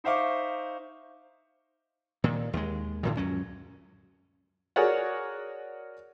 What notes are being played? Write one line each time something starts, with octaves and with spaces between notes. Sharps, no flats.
D#4 C5 E5 F5 C#6 D6
A#2 D#3
D#2 G#3
A2 D3 D#3
C#2 F#2 F#3 C#4
F#4 G#4 A#4 C#5 D5 F#5